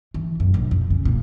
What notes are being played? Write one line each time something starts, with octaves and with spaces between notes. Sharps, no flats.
E3
F#2
A#1
F2
C#3
A#2